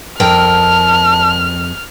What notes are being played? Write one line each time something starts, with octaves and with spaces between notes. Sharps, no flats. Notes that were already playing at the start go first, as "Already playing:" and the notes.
F2 A#4 G5 A5 F6